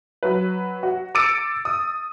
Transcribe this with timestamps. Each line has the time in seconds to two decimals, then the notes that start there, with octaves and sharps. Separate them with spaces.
0.23 F#3 B4
0.83 F#4
1.15 D6 E6 A6 C#7 D7
1.65 D#6